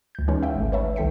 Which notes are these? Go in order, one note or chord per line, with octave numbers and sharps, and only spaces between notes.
D2 G6
E3 G#3 C#4 D#4 C#5
E5 F5 G5
G#1 A3
B4 C#5 E5 A5
C2 D#3 A4 G5 B6 C#7